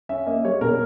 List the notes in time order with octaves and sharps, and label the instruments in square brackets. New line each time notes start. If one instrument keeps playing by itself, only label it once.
[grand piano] C#4 E5
A#3 D#5
G3 C#5
B2 A#4